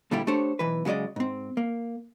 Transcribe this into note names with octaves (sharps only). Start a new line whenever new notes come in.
D2 A#2 G3 A3 E4 G4
A3 D4 G4 A4 C5 C#5
B1 E3 B4
C#3 F#3 G#3 D5 D#5
G#2 C4
A#3